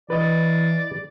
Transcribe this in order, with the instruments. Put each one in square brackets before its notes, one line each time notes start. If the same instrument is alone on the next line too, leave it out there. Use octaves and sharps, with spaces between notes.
[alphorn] E3 [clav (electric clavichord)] B4 D#5 [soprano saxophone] D5